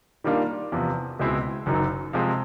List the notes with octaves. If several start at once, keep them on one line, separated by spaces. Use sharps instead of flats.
D#3 G3 A#3 D4 F4
E2 C3 F3
C#2 B2 G#3 C4 E4
F#1 F#2 D#3 F#3
C3 F3 G#3 C4